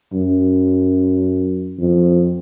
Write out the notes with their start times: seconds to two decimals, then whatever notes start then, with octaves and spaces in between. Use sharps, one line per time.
0.13 F#2
1.79 F2